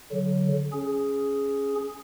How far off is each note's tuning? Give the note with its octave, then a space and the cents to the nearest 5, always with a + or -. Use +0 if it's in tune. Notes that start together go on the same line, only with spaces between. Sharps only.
D3 -25 F#3 +0
C#4 +0 G#4 +0